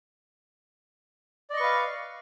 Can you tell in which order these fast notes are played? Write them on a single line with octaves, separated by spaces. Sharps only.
D5 D#5 C#6 B4 F5